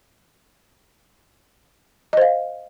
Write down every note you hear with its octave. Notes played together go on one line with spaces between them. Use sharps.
C5 D#5 F5